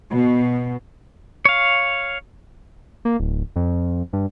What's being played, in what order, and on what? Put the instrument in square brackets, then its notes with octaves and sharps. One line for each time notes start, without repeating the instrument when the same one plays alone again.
[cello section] B2
[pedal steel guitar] C#5 F5
[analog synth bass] A#3
D1
F2
G2